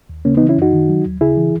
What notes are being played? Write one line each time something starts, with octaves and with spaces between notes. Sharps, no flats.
D#2
C#3 A#3 C#4
B3 D#4
E3
C#4 E4
F#2 D#4 F#4
D#3
F#3
D#2
C#3 E4 G#4
E3